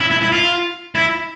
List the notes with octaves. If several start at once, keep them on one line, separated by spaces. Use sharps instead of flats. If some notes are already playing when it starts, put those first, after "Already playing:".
E4
E4
E4
F4
E4